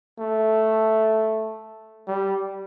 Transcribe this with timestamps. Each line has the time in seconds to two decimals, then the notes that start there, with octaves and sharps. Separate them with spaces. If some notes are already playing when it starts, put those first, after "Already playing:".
0.19 A3
2.07 G3